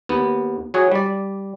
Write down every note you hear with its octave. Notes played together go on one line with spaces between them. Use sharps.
D#2 B3
F#3 F#4 G#4 C#5
G3 D5